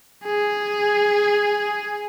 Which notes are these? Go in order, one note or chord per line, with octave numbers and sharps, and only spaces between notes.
G#4